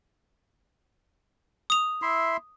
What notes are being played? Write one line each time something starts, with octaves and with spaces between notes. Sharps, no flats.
D#6 F7
E4 E5 C6